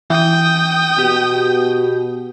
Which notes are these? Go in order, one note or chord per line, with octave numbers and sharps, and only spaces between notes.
E3 G5 D#6
B2 G4